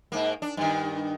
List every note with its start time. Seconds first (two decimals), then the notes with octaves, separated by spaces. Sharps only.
0.12 G#2 A#3
0.42 D4
0.57 G2 D#3